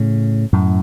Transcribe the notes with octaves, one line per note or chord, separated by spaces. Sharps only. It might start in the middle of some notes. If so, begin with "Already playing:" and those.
Already playing: A2 C#3
F#2 A2